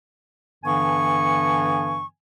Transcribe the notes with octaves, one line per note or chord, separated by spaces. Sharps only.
G2 D3 E3 B3 G#5 C#6